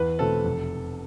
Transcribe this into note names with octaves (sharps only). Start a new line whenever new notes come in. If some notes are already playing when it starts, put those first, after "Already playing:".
Already playing: E2 B4
B2 A3 C4 A4
F1